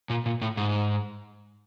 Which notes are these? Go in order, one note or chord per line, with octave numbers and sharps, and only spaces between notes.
A#2
A#2
A2
G#2